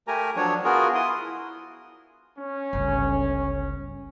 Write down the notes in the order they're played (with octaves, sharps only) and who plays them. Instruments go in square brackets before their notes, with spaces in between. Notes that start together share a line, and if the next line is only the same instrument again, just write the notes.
[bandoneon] A3 G4 A#4 G#5 A#5
F3 F#3 D4 C#5
B3 F4 F#4 G#4 A#4
E4 C6 D#6
[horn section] C#4
[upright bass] G1 C#2